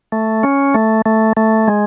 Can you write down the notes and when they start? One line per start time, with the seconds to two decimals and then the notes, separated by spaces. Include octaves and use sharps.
0.12 A3
0.43 C#4
0.74 A3
1.06 A3
1.37 A3
1.68 G#3